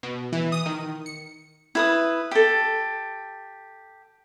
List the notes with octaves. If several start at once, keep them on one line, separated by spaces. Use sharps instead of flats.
B2
E3
D#6
D#3
C#7
E4 B4 D#6
G4 A4